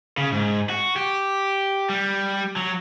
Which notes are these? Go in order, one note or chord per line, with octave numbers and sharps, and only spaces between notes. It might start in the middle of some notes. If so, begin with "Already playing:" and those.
C#3
G#2
F#4
G4
G3
F#3